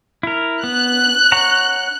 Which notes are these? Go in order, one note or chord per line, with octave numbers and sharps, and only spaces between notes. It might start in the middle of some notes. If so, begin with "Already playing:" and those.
E4 A#4
B3 F#6
C#5 F#5 A#5